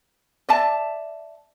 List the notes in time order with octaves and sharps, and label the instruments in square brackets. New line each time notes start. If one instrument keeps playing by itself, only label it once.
[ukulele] D5 E5 A5